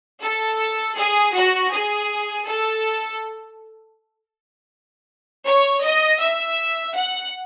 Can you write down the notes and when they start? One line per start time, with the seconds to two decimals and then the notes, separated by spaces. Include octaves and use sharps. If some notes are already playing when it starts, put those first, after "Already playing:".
0.22 A4
0.97 G#4
1.34 F#4
1.72 G#4
2.47 A4
5.46 C#5
5.83 D#5
6.21 E5
6.95 F#5